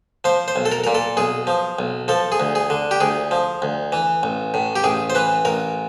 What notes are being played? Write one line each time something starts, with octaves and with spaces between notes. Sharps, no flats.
F3 C5
C5
B1
A4
A#4
A#2 A#4
A4
B1 G#4
F3
B1
F3 A4
G#4
D2
G#4
D3
G4
D2 G#4
F3
D2
E3
A1
A2
G4
A1 G#4
C5
E3 B4
A1 A#4